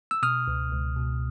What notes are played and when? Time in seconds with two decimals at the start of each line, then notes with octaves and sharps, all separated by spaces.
0.11 E6
0.23 B2 D#6 F6
0.48 C#2
0.72 C#2
0.97 B2